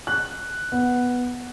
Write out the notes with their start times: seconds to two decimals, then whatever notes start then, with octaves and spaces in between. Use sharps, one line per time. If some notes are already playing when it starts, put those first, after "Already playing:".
0.07 F#6
0.72 B3